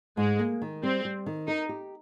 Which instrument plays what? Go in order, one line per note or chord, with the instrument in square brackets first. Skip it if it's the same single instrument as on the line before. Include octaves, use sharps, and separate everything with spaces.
[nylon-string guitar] G#2 [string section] G#3
[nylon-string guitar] A#3
D#3
[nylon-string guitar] G3 [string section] C4
[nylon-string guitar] G3
D#3
[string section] D#4 [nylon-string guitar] A#4
[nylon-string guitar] G4